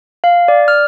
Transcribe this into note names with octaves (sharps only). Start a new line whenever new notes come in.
F5
D5
F6